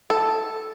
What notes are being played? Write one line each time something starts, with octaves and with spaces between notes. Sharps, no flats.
A4